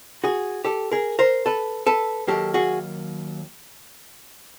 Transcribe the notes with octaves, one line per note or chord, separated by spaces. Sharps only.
F#4 G#4
G4 A4
G#4 A#4
A#4 C5
A4 B4
A4 B4
D#2 D#3 F#3 A#3 G4 A4
F#4 G#4